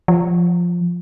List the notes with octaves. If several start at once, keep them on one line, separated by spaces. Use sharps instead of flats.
F3